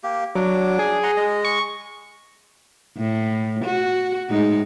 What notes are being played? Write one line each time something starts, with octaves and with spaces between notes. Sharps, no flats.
A#3 G4
F#3 D4 D6
G#4
F#5 A#5 C6
G#3 D#5
C#6
A2
F#4
A2 G#3 D#4